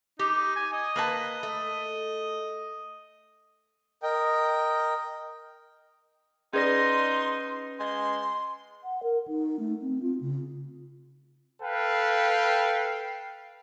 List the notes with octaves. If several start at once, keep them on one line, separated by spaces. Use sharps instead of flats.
D#4 G4
G#5
D#5
A#3 B4 A5
A3
A#4 D#5 G5
C#4 D#4 G#4 B4 D5 C6 A#6
G#3 C6
F#5
A#4
D#4
A3
C4
F4
C#3
A4 B4 F5 G5